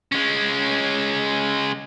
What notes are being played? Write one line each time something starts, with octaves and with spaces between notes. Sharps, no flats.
G#3 C#4